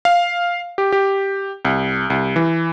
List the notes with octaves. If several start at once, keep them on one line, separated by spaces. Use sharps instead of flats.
F5
G4
G4
C2
C2
E3